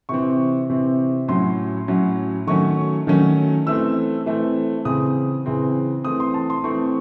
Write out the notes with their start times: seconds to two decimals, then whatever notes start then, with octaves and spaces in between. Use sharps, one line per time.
0.09 C3 E3 C4 C#6
0.70 C3 E3 C4
1.28 A2 F#3 C#4 C6
1.88 A2 F#3 C#4
2.47 D#3 F#3 A3 C#4 C#6
3.07 D#3 F#3 A3 C#4
3.66 E3 A3 C4 E6
4.26 E3 A3 C4
4.85 C#3 E3 C4 D#6
5.46 C#3 E3 C4
6.04 E3 A3 C4 D#6
6.20 C6
6.34 A5
6.50 C6
6.64 E3 A3 C4 C#6